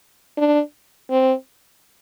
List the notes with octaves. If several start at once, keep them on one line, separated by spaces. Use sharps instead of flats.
D4
C4